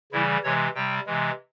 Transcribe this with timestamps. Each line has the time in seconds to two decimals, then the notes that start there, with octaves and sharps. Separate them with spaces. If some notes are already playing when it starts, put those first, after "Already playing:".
0.12 C#3 E3 G3 E4
0.43 C3 E3 G#3 C#5
0.75 C3 G3 G5
1.06 C3 E3 G#3